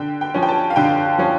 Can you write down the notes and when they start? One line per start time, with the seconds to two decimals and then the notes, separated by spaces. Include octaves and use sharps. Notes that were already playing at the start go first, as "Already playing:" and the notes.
Already playing: D3 G5
0.21 G5
0.34 F3 C#4
0.42 G5
0.49 A5
0.70 F5
0.76 D3 G5
1.18 F3 C#4